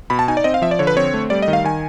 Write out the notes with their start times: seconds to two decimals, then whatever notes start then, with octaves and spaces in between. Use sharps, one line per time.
0.10 B2 B5
0.19 A5
0.28 D#4 G#5
0.37 D5
0.44 C4 D#5
0.54 F5
0.62 F3 E5
0.71 D5
0.79 D3 C#5
0.87 B4
0.97 C4 C#5
1.14 A3
1.30 G3 D5
1.42 D#5
1.48 D#3
1.53 F5
1.64 D#3 G#5